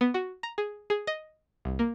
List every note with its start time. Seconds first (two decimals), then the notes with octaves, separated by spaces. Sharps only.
0.01 B3
0.14 F#4
0.43 A#5
0.58 G#4
0.90 G#4
1.07 D#5
1.65 C2
1.79 A#3